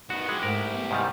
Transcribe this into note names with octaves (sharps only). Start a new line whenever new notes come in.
D#3 B3 F#4
G#3 E4 G4
G#2 A3 A#4 F#5
B3
G#2 C3 D#3 G3